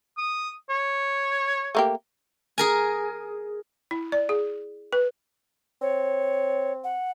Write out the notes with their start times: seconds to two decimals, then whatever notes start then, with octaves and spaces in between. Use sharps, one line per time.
0.18 D#6
0.70 C#5
1.75 A3 A#3 G4
2.58 G#4 A#4 G#5
3.91 E4
4.12 D5
4.29 G#4
4.93 B4
5.82 C4 C#5
6.84 F#5